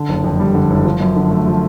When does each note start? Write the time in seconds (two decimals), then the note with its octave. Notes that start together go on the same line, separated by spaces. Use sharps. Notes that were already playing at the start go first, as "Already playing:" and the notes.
Already playing: D3
0.09 F#1
0.24 F2
0.40 G3
0.55 D3
0.70 F#1
0.85 F3
1.00 F#2
1.16 D3
1.31 A3
1.47 F3